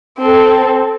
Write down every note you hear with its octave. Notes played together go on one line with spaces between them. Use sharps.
C4 A4